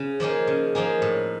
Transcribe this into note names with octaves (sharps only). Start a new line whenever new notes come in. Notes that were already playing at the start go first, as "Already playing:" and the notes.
Already playing: C#3
F3 A#3 D#4 G#4
C#3
F3 A#3 D#4 G#4
A2